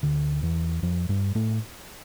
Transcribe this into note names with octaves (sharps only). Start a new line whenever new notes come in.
D2 D3
E2 E3
F2 F3
G2 G3
A2 A3